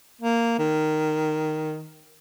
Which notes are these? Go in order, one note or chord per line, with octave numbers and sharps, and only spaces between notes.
A#3
D#3